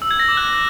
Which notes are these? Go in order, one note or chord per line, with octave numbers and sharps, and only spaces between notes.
E6
G#6
A#6
D6
F#6